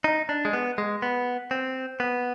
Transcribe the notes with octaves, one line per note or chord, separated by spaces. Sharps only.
D#4
D4
G#3
B3
G#3
B3
C4
B3